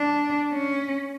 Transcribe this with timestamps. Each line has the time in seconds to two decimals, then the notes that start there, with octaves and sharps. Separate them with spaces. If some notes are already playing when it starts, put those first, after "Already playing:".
Already playing: D4
0.52 C#4